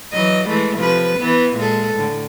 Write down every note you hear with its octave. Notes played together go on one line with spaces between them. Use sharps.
E3 F#3 D#5
E3 G#3 A3
C3 F3 B4
E3 B3
A#2 G#3 A4
A2 D3